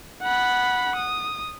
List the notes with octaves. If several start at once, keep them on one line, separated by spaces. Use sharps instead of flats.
F#5 B5
D#6